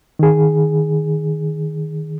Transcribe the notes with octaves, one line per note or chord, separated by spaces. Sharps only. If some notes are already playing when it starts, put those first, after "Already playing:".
D#3 G#4